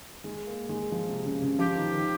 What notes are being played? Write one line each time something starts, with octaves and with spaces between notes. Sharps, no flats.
G#3
A#3
G#3
F3
C3
C#3
C#3
F3 G4
D#3
D#3